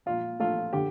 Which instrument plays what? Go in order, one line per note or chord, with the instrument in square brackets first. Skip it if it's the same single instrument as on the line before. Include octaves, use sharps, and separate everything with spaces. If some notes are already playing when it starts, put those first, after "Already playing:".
[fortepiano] A#2 F4
A3 F4
D3 G4